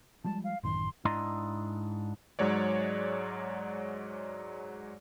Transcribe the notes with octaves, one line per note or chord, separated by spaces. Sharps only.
F3 G3 G#3 A5
F5
A1 F#2 D#3 C6
G#2 D4 E4 D#5 A#5 C6
G#2 F#3 G#3 C#5 D5